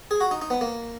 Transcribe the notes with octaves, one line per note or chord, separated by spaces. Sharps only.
G#4
F#4
D#4
D#4
B3
A#3